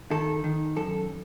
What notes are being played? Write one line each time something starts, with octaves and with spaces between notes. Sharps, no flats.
D#3 A4
D#3
F#2 A4